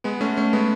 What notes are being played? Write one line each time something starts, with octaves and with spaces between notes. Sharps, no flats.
G#3 B3
A3 C#4
A3 C#4
G#3 B3